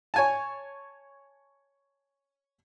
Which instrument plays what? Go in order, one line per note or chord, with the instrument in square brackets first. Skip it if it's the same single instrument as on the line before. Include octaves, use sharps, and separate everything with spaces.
[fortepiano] C#5 G#5 A5